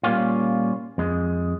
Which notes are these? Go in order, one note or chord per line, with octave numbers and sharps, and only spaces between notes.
A#2 G3 A#3 C#4 F4
F2 G#3